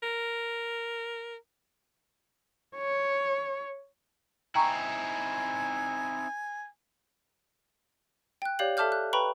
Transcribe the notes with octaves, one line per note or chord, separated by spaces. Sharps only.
A#4
C#5
C4 D#4 E4 G5 G#5 A#5 C#6
G5 F#6
G4 C#5 D5 F5 G6 F#7
A4 E5 A5 D6 F6 G6
F#6
B4 G5 A#5 B5 C#6